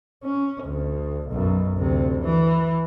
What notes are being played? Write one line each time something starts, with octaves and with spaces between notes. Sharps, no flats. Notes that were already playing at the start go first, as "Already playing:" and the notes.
C#4
D2
B1 F#2
D2 C3
E3